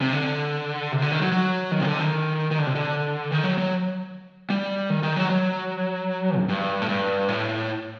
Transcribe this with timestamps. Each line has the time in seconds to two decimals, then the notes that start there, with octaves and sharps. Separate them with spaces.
0.01 C3
0.13 D3
0.92 C3
1.02 D3
1.12 D#3
1.22 F#3
1.32 F#3
1.71 D#3
1.80 C3
1.85 D3
1.99 D#3
2.51 D#3
2.58 D3
2.67 C3
2.75 D3
3.31 D#3
3.43 F#3
3.58 F#3
4.50 G3
4.90 D#3
5.03 D#3
5.16 F#3
5.30 F#3
6.39 F#2
6.49 G2
6.81 A2
6.89 G2
7.28 A2